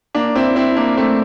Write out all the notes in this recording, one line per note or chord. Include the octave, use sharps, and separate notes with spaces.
A#3 D4
C4 E4
C4 E4
A#3 D4
A3 C4